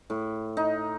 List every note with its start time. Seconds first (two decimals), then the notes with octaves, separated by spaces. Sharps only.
0.10 A2
0.57 D#4